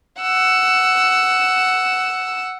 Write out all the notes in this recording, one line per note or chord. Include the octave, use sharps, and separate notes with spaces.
F#5 E6